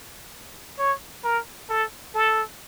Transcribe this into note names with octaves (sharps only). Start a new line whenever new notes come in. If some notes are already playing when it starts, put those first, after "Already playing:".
C#5
A#4
A4
A4